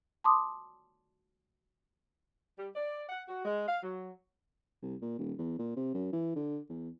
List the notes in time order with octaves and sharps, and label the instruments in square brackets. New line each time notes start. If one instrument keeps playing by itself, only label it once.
[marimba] A5 C6 D6 D#6
[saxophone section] G3
D5
F#5
F#4
G#3
F5
F#3
[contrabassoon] C2
A#2
D#1
E2
A#2
C3
F#2
E3
D3
E2